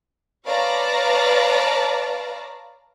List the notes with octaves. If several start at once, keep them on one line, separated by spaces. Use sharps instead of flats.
B4 C#5 D5 F5 A5 A#5